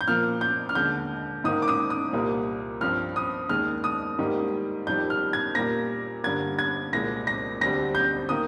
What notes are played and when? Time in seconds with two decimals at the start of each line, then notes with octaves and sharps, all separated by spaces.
0.01 G6
0.08 A#2 F3 A#3 F6
0.41 G6
0.69 F6
0.75 D#2 D3 G#3 G6
1.44 G#2 D#3 A#3 D#6
1.62 D6
1.68 D#6
1.90 D#6
2.13 C2 A#2 G3 A#3
2.81 G2 F3 C4 F6
3.16 D#6
3.49 D#2 D#3 G#3 F6
3.84 D#6
4.19 G#2 D#3 G3 A#3
4.87 F2 D#3 G3 G6
5.10 F6
5.33 G#6
5.55 A#2 G3 A#3 A#6
6.24 G2 D3 G3 A#3 G#6
6.59 G#6
6.93 C2 A#2 G#3 A#6
7.27 A#6
7.61 D2 D3 G3 C4 A#6
7.95 G6
8.29 D#3 A#3 D#6